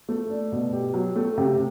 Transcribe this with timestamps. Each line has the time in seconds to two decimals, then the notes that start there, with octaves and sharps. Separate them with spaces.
0.09 A3
0.30 D4
0.52 B2
0.73 G4
0.94 F#3
1.16 A3
1.38 C3